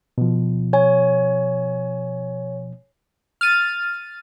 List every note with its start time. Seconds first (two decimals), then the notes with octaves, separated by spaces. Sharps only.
0.18 B2 F3
0.73 C#5 G#5
3.41 F6 A6 D#7